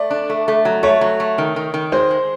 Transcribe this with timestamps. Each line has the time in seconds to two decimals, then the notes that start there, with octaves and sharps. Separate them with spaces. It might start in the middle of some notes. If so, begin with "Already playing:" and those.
Already playing: A3 D5
0.10 D4
0.30 A3
0.48 A3
0.65 F#3
0.83 A3 C#5
1.01 F#3
1.20 A3
1.38 D#3
1.56 D#3
1.74 D#3
1.92 G#3 C5
2.11 G#3